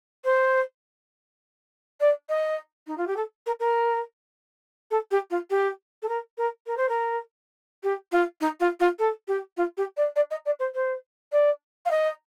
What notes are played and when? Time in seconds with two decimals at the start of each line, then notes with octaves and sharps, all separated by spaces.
0.25 C5
2.00 D5
2.29 D#5
2.87 D#4
2.97 F4
3.07 G4
3.16 A4
3.46 A#4
3.60 A#4
4.91 A4
5.11 G4
5.30 F4
5.50 G4
6.02 A4
6.09 A#4
6.38 A#4
6.67 A#4
6.77 C5
6.89 A#4
7.83 G4
8.12 F4
8.41 D#4
8.60 F4
8.80 F4
8.99 A4
9.28 G4
9.57 F4
9.77 G4
9.97 D5
10.16 D5
10.31 D#5
10.46 D5
10.59 C5
10.75 C5
11.32 D5
11.86 F5
11.91 D#5